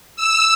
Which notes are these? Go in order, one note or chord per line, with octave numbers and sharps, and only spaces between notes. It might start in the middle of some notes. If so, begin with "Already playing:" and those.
E6